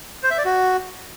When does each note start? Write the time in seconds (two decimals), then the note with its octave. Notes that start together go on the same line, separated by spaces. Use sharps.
0.23 C5
0.31 E5
0.38 D5
0.45 F#4